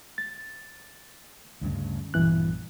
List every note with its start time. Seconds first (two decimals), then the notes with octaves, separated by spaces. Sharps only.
0.18 A6
1.61 D2 G2 C#3
2.14 A#1 G2 B2 E3 F#6